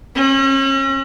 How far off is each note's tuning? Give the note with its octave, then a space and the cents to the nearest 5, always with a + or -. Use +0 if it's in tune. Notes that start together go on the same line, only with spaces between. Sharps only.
C#4 -35